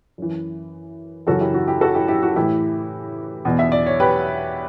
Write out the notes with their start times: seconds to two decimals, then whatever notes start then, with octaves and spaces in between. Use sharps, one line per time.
0.18 F#2 E3
1.27 F#2 C#3 E3 F#4 A4
1.41 E4 G4
1.54 F#4
1.68 E4 G4
1.81 F#4 A4
1.95 E4 G4
2.08 E4 G4
2.23 F#4
2.36 A2 E3 E4 G4
3.45 E2 B2
3.59 E5
3.72 D5
3.87 C#5
4.00 G4 B4